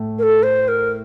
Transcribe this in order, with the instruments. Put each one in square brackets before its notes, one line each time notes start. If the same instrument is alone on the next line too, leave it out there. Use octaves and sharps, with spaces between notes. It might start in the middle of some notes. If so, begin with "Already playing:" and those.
Already playing: [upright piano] A2 A3
[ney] A#4
A4
C5
A#4